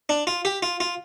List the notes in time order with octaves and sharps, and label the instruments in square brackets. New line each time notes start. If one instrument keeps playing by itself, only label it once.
[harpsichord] D4
F4
G4
F4
F4